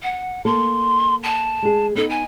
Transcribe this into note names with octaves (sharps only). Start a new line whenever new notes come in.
F#5
A#3 A4 C6
A5
G#3 G#4
B3 D#4 A4
G#5